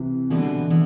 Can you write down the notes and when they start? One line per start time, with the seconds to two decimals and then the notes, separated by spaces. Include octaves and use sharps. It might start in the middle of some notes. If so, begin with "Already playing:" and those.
Already playing: C3 E3
0.30 B2 D3 E3 G3 B3 F#4 B4
0.70 E3 B3